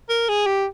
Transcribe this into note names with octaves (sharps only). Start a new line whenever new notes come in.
A#4
G#4
G4